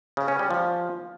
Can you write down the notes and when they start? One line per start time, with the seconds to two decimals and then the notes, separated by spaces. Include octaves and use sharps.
0.17 C#3
0.28 C#4
0.39 G3
0.50 F3